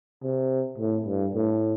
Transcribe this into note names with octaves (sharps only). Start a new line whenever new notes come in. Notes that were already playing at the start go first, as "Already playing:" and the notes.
C3
A2
G2
A2